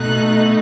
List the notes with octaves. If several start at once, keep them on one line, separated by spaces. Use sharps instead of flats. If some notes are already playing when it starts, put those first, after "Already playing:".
Already playing: B2 A3 D#4 F#6